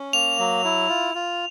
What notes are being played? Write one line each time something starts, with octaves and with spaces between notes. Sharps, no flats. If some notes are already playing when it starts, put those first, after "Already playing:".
Already playing: C#4
A#3 F7
F#3
E4
F4
F4